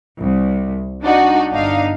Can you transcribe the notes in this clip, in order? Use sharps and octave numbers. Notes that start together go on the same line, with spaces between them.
C2
D4 D#4 F#4
G1 D4 D#4 F5